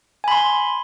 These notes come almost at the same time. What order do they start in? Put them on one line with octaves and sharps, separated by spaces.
G#5 B5 C6